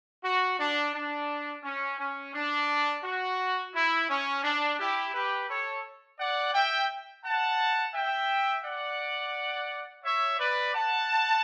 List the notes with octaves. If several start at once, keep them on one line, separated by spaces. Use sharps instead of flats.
F#4
D4
D4
C#4
C#4
D4
F#4
E4
C#4
D4
E4 G4
G4 B4
A4 C#5
D5 F#5
E5 G5
F#5 A5
E5 G5
D5 F#5
C#5 E5
B4 D5
F#5 A5